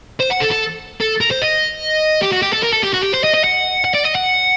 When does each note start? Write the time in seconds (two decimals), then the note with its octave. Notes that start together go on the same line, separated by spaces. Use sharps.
0.20 C5
0.30 F#5
0.40 A4
0.50 A4
1.01 A4
1.21 A#4
1.31 C5
1.42 D#5
2.22 G4
2.32 F#4
2.43 G4
2.53 A4
2.63 A#4
2.73 A4
2.83 G4
2.94 F#4
3.03 G4
3.14 C5
3.24 D#5
3.34 D#5
3.44 F#5
3.85 F#5
3.94 D5
4.05 D#5
4.16 F#5